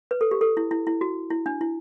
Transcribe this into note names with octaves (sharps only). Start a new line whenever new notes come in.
B4
A4
G4
A4
E4
E4
E4
F#4
E4
D4
E4